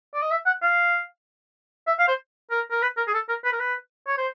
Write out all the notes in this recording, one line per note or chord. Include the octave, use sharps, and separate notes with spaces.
D5
D#5
E5
F#5
F5
E5
F5
C5
A#4
A#4
B4
A#4
G#4
A4
A#4
B4
A#4
B4
C#5
C5